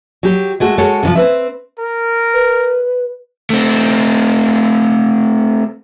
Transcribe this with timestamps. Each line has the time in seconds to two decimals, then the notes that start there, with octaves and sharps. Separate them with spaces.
0.23 F#3 G4
0.60 G#3 A3 F#4
0.78 G#3 F#4 A4 C#5
1.03 C3 E3 F3
1.15 C4 B4 E5
1.79 A#4
2.34 B4
3.50 A3 C4